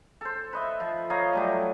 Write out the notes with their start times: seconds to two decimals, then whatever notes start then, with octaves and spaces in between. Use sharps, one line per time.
0.21 A4 C5
0.53 B4 D#5 E5
0.80 F3
1.10 C#5 D#5 F5 A#5
1.33 F#3 G3 A3